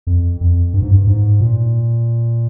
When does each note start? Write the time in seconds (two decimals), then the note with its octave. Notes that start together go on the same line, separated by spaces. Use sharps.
0.07 F2
0.41 F2
0.74 G2
0.82 G#2
0.91 G2
1.07 G#2
1.41 A#2